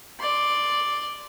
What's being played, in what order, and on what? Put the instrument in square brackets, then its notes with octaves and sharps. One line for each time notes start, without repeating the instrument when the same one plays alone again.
[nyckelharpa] D5 C6